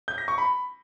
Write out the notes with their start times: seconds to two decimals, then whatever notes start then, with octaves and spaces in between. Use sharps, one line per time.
0.08 G6
0.18 A#6
0.28 C#6
0.38 B5